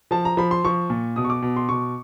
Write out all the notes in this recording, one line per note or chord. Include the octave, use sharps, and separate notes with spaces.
F3 A5
A#5
F3 B5
C6
F3 C#6
A#2
B2 D#6
C#6
D6
B2
C6
B2 C#6